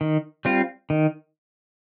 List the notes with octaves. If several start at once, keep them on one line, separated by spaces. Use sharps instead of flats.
D#3
G3 C4 F4
D#3